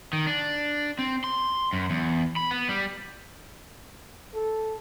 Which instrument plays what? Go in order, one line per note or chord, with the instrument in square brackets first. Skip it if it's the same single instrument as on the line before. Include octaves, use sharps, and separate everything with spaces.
[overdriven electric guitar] D#3
D4
C4
C6
F#2
E2
B5
B3
G3
[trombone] A4